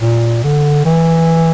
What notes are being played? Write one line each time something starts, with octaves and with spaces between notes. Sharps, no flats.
A#2
D3
E3